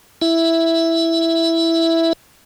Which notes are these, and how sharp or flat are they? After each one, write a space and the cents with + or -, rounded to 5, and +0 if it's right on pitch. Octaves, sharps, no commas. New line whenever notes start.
E4 +0 E5 +0